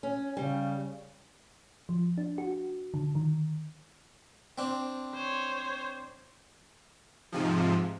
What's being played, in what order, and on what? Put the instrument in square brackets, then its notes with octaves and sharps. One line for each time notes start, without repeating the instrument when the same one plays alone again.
[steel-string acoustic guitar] C#4
[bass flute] C#3 [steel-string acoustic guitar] G3
[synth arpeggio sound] F3
D4
F#4
D3
D#3
[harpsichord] C4 D4
[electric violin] C5 C#5
[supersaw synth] G#2 C3 F3